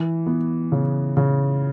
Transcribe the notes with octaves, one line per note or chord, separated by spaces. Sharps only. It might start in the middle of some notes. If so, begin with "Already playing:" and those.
Already playing: E3
B3
C#3
C#3